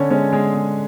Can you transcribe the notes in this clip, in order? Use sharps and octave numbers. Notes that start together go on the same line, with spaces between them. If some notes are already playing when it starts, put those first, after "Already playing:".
Already playing: D3 C#4 C#5
G#3 C#4 C#5
D3 G#3 G#4
G#3